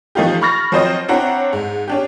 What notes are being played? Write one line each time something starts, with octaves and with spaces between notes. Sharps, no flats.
E3 F3 A3 D#4 F4 G4
B5 C#6 F6 A6 A#6
F3 F#3 C4 C5 C#5 D#5
C4 D4 E4 C#5 F#5 A#5
G#2
C#4 D4 G4